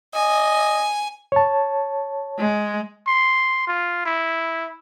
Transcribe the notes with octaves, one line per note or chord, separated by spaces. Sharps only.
D#5 G#5
C#5 A5
G#3
C6
F4
E4